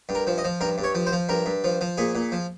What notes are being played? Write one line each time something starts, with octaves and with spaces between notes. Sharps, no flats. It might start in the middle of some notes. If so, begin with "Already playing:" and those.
G2
A#4
F3
D#5
F3
G2 A#4
G2
C#5
F3
C5
F3
G2 A#4
G2
F3
F3
A#2 G#4
A#2
F3